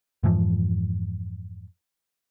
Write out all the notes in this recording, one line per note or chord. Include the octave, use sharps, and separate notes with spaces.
F2 G#2 E3 F3